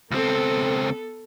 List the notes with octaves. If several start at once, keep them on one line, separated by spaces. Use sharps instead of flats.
C#2 B3 C4 A4